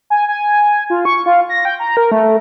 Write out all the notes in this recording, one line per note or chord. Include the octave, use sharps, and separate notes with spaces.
G#5
G#5
F4
C#6
F4
A#6
G5
A#5
A#4
A3